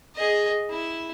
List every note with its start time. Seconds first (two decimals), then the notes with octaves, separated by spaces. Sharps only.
0.15 G#4 D#5
0.70 E4